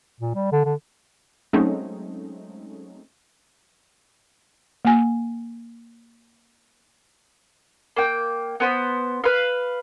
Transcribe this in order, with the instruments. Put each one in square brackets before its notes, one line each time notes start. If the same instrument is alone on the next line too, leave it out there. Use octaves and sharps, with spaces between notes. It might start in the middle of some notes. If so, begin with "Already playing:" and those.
[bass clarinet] A#2
G3
D3
D3
[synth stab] F#3 G#3 A3 C4 C#4 D#4
[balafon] A#3 G#5
[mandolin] A#3 G5
B3 C5 B5
B4 F5